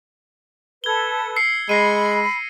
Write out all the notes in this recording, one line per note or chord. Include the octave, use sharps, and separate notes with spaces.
A4 B4 G#6 G7
E6 C7 C#7
G#3 B5 A#6 C7 D#7